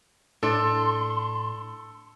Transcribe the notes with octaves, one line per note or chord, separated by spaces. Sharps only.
A2 D4 A4 C6